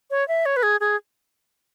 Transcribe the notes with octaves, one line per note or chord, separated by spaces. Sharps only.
C#5
E5
C#5
B4
G#4
G#4